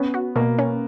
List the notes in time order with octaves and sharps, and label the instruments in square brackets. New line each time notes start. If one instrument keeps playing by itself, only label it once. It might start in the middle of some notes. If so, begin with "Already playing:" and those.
Already playing: [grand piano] B3 [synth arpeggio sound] C#4
[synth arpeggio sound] F#4
[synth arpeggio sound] B2 [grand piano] A#3
[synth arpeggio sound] C#4